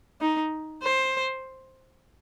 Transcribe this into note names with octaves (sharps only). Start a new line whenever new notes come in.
D#4
C5